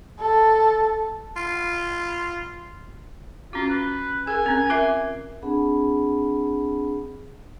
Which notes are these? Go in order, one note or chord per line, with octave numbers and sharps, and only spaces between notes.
A4
F4
C#4 F4 F#4
B4
G#4 A#4 G#5
C4 C#4 A#4
F4 A#4 E5
C4 D4 G#4 F#5 A5 B5